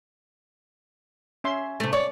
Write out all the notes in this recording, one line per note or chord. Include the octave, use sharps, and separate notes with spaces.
C#4 E5 C6
C3 A3
C#5 D5